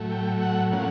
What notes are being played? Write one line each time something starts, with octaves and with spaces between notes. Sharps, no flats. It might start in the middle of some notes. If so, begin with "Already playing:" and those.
Already playing: A2 F#3 A3
G5
F#5
A2 F3 A#3 C#4 F#5